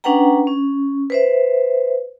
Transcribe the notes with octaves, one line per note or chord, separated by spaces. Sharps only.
C#4 D4 B4 F#5 G5 A#5
C#4
B4 C5 E5